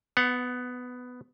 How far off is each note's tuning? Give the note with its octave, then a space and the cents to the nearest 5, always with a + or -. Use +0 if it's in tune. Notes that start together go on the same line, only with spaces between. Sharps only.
B3 +10 F#5 -15